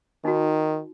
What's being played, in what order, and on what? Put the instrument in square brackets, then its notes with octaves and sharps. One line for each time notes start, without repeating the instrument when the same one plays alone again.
[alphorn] D#3 [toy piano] D#4 F#4